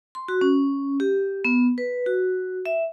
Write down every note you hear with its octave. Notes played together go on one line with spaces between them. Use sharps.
C6
F#4
C#4
G4
B3
B4
F#4
E5